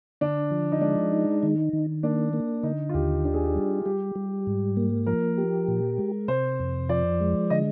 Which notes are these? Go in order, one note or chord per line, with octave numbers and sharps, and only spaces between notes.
D3 D4
F3
D#4
G#3 D4
D#4
D#3
D#3
A#3 D4
A#3
D3 D#4
F4
D#2 G4
D4 G4
G#4
G4
G3
G3 G4
G3
G#2
A#3
F3 A#4
G4
A#2
G#3
C3 C5
F2
F3 D5
G#3
D3 D#5